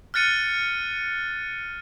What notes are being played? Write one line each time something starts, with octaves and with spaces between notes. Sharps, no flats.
F6 F#6 A6 C#7 D#7